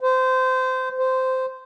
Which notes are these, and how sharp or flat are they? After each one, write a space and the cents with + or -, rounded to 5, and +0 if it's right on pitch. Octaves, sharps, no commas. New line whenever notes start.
C5 -20
C5 -10